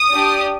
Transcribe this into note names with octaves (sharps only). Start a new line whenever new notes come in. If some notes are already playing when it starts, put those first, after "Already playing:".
Already playing: D#6
D4 G4